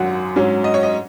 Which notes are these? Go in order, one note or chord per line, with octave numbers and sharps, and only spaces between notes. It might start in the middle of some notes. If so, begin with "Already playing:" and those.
Already playing: G#1 F#2 F#3 F#5
G#2 F#3 C#4
D#5
C#5
D#5